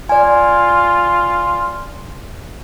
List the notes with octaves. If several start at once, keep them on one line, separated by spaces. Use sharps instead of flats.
F4 D5 G#5